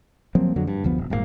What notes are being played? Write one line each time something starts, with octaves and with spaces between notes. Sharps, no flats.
F3 F#3 A#3 C4
F2 D3 F#3
G2
F1 D2 F3 B3
D#1
D#1 G#2 G3 A#3